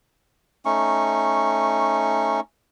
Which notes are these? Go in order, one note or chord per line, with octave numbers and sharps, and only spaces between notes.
A3 C#4 D#4 C#6